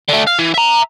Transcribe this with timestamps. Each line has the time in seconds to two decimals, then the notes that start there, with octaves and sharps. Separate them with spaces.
0.09 D3 A3
0.27 F5
0.39 E3
0.54 E5 A#5